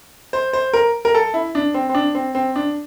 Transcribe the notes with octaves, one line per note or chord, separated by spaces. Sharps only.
C5
C5
A#4
A#4
A4
E4
D4
C4
C4
D4
C4
C4
D4